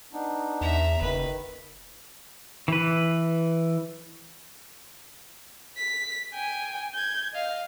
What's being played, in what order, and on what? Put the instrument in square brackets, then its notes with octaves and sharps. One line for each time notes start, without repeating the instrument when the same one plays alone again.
[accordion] B3 D4 D#4
[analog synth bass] E2 [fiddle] E5 A#5
[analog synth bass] F#1 [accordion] D#3 [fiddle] B4
[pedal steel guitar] E3 B4
[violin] B6
G5 G#5
G6 G#6
D#5 F5